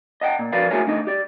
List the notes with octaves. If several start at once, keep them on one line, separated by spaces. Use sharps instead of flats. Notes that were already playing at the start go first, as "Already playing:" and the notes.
D#5 F#5 G5
A#2
F3 F#4 A#4 B4 D5 F5
A3 E4 F#4 G#4 A#4 C#5
D3 A3 D#4 D#5
G4 D5